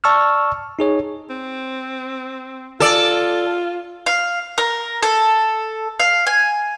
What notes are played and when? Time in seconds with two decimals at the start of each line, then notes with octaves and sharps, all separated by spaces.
0.04 D5 A5 C#6 E6 F6
0.79 D#4 G#4 C#5
1.30 C4
2.80 F4 A4 D5
4.06 F5
4.58 A#4
5.03 A4
6.00 F5
6.27 G#5